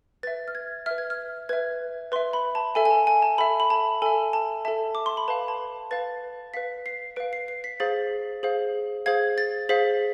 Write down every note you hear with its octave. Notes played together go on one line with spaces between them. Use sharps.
B4 E5 A6
F6
G#6
B4 E5 F6
G#6
F6
B4 E5 G#6
B4 E5 C6
B5
A5
A4 E5 G#5
G#5
A5
G#5
A5
A4 E5 B5
B5
A5
A4 E5 G#5
A5
A4 E5 A5
D6
C6
B5
B4 F5 A5
A5
B4 F5 A6
B4 F5 B6
C7
B4 F5 D7
C7
C7
B6
G#4 C5 F5 A6
G#4 C5 F5
G#4 C5 F5 G#6
A6
G#4 C5 F5 B6